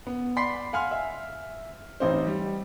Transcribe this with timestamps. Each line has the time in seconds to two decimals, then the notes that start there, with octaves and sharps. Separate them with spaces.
0.07 B3
0.36 D5 F#5 B5 C6 B6 C7
0.73 F5 F#5 G#5 C6 F6
0.91 E5
2.00 A1 C4 D#4 C5
2.27 G3